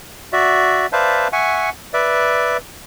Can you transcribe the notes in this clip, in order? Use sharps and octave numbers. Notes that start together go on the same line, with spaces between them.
F#4 D5 E5
B4 C5 D5 E5 F5 A5
E5 F#5 G#5 C#6
B4 D5 E5